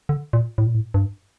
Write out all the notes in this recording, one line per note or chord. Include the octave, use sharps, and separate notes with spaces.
D3
A#2
A2
A#2
A2
G2